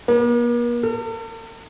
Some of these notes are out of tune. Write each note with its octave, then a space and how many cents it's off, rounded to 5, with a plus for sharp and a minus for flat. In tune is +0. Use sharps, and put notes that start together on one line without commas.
A#3 +45
A4 +45